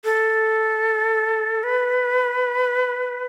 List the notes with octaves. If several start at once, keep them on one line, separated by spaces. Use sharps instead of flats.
A4
B4